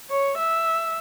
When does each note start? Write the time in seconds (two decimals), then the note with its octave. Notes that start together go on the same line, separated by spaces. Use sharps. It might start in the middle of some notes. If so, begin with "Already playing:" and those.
0.10 C#5
0.38 E5